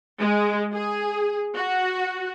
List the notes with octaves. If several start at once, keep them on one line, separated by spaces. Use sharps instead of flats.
G#3
G#4
F#4